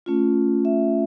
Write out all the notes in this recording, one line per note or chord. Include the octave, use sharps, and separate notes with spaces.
A3 C#4 F4
E5